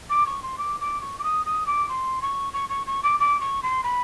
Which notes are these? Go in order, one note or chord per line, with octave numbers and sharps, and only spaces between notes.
D6
C#6
C6
D6
D6
C#6
D6
D#6
D#6
D6
C6
C#6
C#6
C#6
C#6
D6
D6
C#6
C6
B5